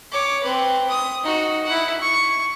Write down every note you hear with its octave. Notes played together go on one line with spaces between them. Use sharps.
C#5 D6
C4 B4
D#6
D#4 F#4
E4 F#5
C#6